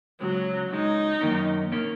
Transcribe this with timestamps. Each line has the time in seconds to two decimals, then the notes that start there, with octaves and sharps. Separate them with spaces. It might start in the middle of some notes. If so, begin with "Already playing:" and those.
0.21 C#2 C#3 F#3 G#3
0.71 C#2 C#3 G#3 D#4
1.21 F#2 D#3 A#3 C#4
1.72 D#3 A#3 C#4